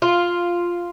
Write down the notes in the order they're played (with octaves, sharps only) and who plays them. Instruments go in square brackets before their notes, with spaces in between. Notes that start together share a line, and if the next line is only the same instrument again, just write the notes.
[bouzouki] F4